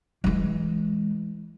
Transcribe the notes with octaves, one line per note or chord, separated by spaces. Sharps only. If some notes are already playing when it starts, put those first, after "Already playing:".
E3 G#3